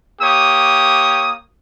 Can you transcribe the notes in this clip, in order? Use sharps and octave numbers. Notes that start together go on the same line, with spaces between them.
A#3 G4 C#5 D#6